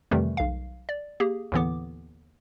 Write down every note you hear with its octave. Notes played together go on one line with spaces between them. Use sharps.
F2 C3 D#3 E3 G3 A3
B1 F5
D5
A#3 G4 G#4
D#2 A2 D3 E3 B3 D6